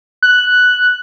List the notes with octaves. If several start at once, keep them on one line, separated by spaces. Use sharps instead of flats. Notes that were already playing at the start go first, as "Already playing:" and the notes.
F#6